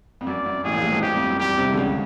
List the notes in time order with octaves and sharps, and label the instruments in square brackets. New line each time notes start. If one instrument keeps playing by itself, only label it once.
[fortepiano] F2
[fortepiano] F#2 [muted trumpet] D5
[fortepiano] F#2
[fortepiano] A1 A2 [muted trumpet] G#4
[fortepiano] A#1 A#2
A1 A2
G#1 G#2
[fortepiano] G2 [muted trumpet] G4
[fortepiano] F2
F#2
[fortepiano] G2 [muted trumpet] G4
[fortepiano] C2 C3
D3
C#2 C#3